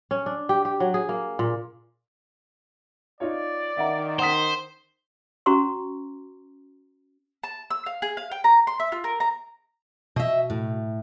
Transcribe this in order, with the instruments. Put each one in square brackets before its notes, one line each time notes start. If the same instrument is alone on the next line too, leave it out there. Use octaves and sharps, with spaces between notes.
[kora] C#4
D4
G4
G4
F#3
G#4
A#3
A#2
[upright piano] D#4 F4 C#5 [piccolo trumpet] D5
[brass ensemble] D#3 [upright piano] E5 F#5 A#5
[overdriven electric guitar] C5 [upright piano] F#5 D#6 B6
[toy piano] C#4 F#4 C5 A#5 C6 C#6
[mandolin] A5
E6
F5
G#4
F5
G5
A#5
C6
E5
F4
A#4
A#5
[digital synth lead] B2 [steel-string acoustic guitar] D#5 E5
[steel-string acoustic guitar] A2